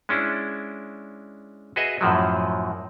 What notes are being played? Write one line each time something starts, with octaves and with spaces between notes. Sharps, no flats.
G#3 C#4 D4 E4
F#4 G#4 B4 D#5 E5
F#2 A2 F3 F#3